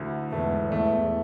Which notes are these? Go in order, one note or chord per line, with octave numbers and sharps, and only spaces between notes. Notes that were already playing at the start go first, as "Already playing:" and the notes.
Already playing: D2 D3 E4
E2 G#2 A3
E2 A3